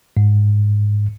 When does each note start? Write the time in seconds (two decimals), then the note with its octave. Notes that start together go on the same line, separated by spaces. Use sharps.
0.17 G#2